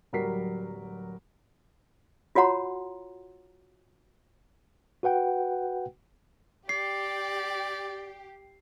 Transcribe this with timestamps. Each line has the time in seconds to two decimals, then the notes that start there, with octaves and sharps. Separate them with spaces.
0.13 D1 F#3 G3 A#4 B6 C7
2.35 F4 F#4 C#5 F#5 A#5 C6
5.03 F#4 B4 F#5 G5
6.69 G4 D5 C7